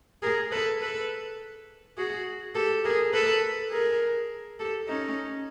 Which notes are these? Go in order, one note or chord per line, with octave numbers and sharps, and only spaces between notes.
G#4 A#4
A4 B4
A4 B4
F#4 G#4
G4 A4
G#4 A#4
A4 B4
G#4 A#4
G4 A4
C#4 D#4